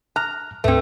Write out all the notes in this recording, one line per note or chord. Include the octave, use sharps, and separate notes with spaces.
A#5 F6 F#6
D2 G#2 A3 C4 B4